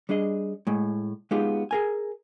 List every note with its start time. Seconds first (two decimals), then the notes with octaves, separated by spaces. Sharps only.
0.09 G3 D4 G#4 D#5
0.67 A2 G#3
1.31 G#3 B3 D#4 F4 G4 G#4
1.71 G#4 A#4 G#5